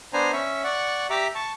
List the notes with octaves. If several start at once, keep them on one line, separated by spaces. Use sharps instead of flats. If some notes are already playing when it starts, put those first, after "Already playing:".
B3 D4 C5 G#5 A#5
C#4 E5 C#6
D5 F#5 C#6
G4 E5 A#5 D6
A5 C#6